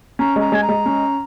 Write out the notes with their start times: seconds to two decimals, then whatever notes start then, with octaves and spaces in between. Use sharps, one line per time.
0.19 C#4 A#5
0.36 G#3 A#5
0.52 G#3 G#5
0.63 A#5
0.69 G#3
0.86 C#4